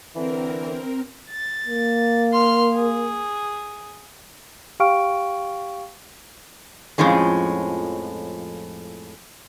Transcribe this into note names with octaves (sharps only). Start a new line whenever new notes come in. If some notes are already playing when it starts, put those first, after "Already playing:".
D3 E3 C4 A#4
A6
A#3
C6 F6
G#4
G4 F5 G5 C#6 F6 D7
F2 A2 F3 G#3 C#4